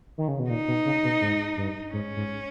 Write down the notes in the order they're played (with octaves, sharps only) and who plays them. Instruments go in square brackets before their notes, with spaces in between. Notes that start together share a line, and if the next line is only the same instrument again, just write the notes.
[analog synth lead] D#3
C#3
B2
[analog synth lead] A#2 [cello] D#4
[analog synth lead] B2
C#3
B2
G#2
G2
[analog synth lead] G#2 [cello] C#4
[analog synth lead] G#2